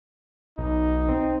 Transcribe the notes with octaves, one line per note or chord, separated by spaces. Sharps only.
B1 D#4
C4